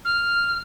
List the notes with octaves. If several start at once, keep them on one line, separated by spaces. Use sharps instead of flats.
F6